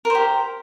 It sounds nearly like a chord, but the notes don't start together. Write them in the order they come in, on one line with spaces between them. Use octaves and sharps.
A#4 C5 G4